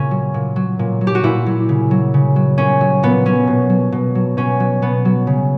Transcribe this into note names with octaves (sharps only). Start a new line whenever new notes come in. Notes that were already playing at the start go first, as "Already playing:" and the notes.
Already playing: A#2 C#3 C#4
F#3
A#2
F#3
A#2
F#3
G4
F#4
A#2 E4
F#3
C#3
F#3
C#3
F#3
A#2 C#4
F#3
A#2 B3
F#3 C#4
B2
F#3
B2
F#3
B2 C#4
F#3
B2 B3
F#3
C#3